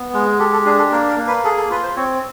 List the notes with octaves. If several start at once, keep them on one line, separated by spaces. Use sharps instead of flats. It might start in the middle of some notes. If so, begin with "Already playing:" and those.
Already playing: B3
G#3
G4 A4
A4
D4 G#4
A4
A#3 A#4
A#4
A#3
B4
G#4 A4
A4
F4 B4
C5
C4 C#5